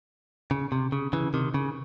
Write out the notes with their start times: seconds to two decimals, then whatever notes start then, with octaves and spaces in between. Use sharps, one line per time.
0.51 C#3
0.72 C3
0.92 C#3
1.13 C#3 E3
1.34 C3 D#3
1.54 C#3